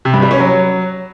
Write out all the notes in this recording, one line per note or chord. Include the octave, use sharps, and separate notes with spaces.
C3
G2
G3
C#4
F#3